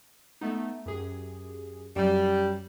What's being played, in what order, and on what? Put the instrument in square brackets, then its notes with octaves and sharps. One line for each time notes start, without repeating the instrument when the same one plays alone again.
[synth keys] A3 B3 D#4
F#2 G4 G#4
[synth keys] F#2 F#3 E7 [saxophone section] G3